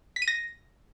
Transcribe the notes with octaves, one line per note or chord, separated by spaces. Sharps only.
B6
D#7
A#6